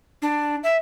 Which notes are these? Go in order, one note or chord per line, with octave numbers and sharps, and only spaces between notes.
D4
E5